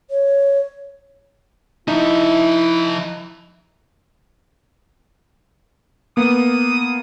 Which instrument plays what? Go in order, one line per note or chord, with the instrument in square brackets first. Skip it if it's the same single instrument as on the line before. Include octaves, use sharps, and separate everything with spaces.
[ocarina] C#5
[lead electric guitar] F3 E5 [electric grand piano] D#4 [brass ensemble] E4
[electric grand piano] A#3 B3 [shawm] D#6